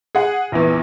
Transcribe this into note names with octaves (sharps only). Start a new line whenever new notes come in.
G#4 F#5
A#1 E2 E3